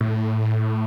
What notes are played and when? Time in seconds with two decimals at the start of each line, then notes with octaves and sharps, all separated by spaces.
0.01 A2